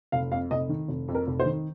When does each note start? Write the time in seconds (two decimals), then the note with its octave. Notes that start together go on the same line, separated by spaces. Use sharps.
0.12 F1 F5
0.32 F2 F5
0.51 F1 D#5
0.69 D#3
0.88 F1
1.08 F2
1.15 A#4
1.27 F1
1.40 C5
1.46 D#3